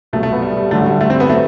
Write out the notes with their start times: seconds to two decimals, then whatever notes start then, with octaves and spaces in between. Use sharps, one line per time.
0.13 C2 B2 F#3 A3
0.23 A3
0.32 B3
0.42 G3
0.57 G3
0.71 A1 G2 D3 F#3 A3
0.86 G3
1.01 A3
1.10 C4
1.20 B3
1.30 F#3 A3